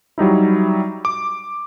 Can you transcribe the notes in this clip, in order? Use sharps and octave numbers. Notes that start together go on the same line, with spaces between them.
F#3 G3 D#4 E4
D6